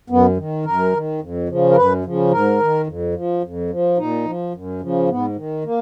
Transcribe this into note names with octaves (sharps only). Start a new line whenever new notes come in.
F#2 B3
D#3
F#2 A#4
D#3
F2
C#3 F3
A#4
F#2 B4
C#3 F3
G#2 A#4
D#3
F2
F3
F2
F3
A#2 D#4
F3
F#2
C#3 F3
G#2 B3
D#3
A#3